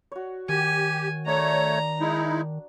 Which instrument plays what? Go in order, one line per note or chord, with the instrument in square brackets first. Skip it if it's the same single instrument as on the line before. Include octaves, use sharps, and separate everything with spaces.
[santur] F#4 C#5
[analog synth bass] D#3 [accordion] G4 [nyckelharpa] G#5
[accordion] A3 C#5 [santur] D4 [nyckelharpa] A#5
[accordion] G#3 D#4 E4